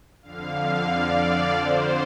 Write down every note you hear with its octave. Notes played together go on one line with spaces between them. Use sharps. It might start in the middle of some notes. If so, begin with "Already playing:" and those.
F2 D3 F5
D5
F2 D3 C5